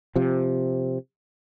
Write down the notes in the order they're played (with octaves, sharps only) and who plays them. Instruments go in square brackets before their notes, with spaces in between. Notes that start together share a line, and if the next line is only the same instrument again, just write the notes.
[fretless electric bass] C3 F3